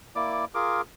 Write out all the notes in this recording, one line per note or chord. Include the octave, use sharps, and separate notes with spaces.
A#3 E4 D5 D6
F4 G#4 A#4 D6